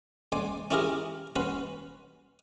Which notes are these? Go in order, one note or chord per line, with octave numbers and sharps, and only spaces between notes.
C#2 D5 G#5 C6
C#4 E4 F4 G4 G#4 A#4
C#4 F#4 B4 C6